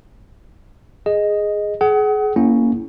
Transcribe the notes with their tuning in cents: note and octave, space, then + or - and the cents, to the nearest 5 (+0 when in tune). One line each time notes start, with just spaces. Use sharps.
G#4 +0 D#5 +0
G#4 +30 F#5 +30
A#3 +0 C#4 +0 E4 +0